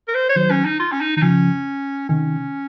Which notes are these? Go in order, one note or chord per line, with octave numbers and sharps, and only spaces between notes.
A#4
C5
C#5
D#3 F#3 C5
C#4
D#4
F4
C#4
D#4
D#3 D#4
C#3 F3 C#4
C3 D#3 C#4